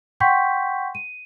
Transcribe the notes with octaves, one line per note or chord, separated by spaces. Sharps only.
F#5 G5 C6 C#6 G6 B6
D#7